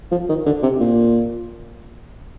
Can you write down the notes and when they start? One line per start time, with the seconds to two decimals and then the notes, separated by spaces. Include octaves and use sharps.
0.12 F3
0.29 D#3
0.46 D3
0.63 C3
0.80 A#2